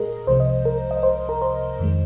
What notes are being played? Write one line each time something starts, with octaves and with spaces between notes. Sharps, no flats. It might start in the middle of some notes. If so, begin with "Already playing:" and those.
Already playing: A#2 G#3 G#4 A#4 D#5
C2 C3 F3 G#3 C5
D#5
A#4
D#5
C5
A#4
C5
F2 D#3 G#3